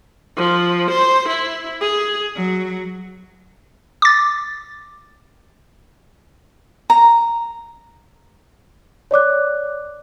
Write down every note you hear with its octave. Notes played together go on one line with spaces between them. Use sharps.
F3
C5
E4
G#4
F#3
D6 A6
A#5
C#5 D5 D6 F#6